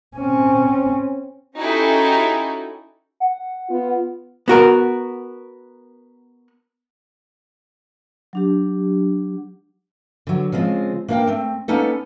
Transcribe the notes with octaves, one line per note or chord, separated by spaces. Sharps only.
C4 C#4
C#4 D#4 E4 F#4 G4 A4
F#5
B3 F4
B3 F#4 A#4
F#3 D4 G4
D3 F#3
C#3 F3 G#3 C4 F4
A#3 D4 A#4 C5 F5 G5
A3 C4
A#3 B3 C#4 D#4 A4